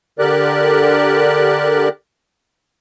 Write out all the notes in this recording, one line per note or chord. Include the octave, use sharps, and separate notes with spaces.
D3 G4 A#4 D5 F#6